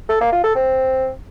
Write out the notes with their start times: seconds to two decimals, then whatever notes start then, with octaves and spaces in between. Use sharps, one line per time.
0.09 A4
0.21 A#3
0.32 F4
0.44 A4
0.55 C4